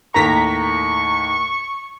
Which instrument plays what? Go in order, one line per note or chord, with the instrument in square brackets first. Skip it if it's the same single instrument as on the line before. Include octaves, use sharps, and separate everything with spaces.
[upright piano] D#2 A2 A#3 [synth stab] A#5 B6 [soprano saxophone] C#6